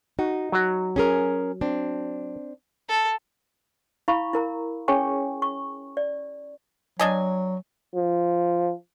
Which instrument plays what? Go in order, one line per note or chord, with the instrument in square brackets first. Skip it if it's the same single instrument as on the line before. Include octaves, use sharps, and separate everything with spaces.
[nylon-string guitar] D#4 [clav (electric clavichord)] F#4
[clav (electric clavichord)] F#3 F#4
[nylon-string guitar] C#4 G#4 A#4
C4 D4
[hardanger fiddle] A4
[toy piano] E4 F5 B5 C#6
E4 A#4 A#5
C#4 G#4 C#5 G5 G#5 C#6
C#6
D5
[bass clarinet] F#3 [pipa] D4 D#5 G#5
[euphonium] F3